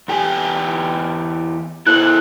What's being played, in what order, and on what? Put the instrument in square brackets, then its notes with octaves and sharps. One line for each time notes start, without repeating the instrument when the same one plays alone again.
[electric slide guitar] E2 G4 G#5
[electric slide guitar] E4 A4 C5 [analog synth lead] F#6